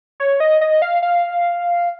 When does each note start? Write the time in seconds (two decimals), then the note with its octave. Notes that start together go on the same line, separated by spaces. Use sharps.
0.20 C#5
0.40 D#5
0.61 D#5
0.82 F5
1.02 F5